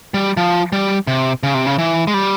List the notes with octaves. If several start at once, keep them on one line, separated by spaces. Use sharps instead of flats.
G3
F3
G3
C3
C#3
C3
C#3
E3
G#3
G3